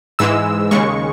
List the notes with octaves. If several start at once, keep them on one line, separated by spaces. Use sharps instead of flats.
G#2 E3 G#3 E6
D#2 C#3 G#3 C#6